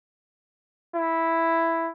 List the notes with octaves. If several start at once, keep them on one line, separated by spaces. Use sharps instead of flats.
E4